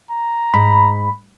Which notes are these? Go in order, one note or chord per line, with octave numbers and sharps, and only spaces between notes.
A#5
G#2 B5